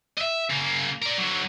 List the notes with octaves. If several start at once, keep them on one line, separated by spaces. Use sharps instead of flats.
D#5 E5
C#3 A#3
A#4 D5
D3 F#3